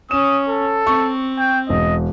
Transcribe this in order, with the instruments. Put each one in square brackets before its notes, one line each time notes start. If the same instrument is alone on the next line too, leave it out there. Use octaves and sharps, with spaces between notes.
[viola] C#4 [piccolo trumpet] D#6 [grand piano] E7
[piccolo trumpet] A4
[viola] C4 [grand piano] C#6
[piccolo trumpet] G5
[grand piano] E1 [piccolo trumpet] D#5